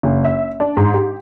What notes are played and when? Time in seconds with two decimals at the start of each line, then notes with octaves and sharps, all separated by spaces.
0.03 F#1
0.25 E5
0.60 D4
0.77 G#2
0.94 G4